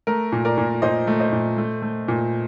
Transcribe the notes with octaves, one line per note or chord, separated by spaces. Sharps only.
A3 A#4
A#2
A#4 D5
A#2
A#2 C5 D#5
A3
C5 D#5
A#2
A3
A3
A#2